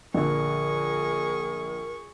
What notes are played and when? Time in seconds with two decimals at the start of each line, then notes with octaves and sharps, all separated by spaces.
0.14 A#1 D3 G#4 A#4 C#6